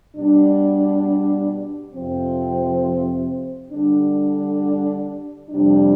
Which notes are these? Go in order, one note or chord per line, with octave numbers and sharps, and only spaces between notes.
B2 G3 D4
F2 C3 F3 C4
D3 G3 D4
F2 C3 G3 D4